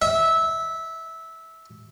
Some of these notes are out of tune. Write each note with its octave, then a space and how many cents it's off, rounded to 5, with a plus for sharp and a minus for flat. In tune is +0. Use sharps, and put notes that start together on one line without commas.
E5 -15